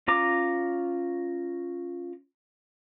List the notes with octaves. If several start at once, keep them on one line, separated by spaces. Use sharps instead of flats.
C#4 F4 A#5 D6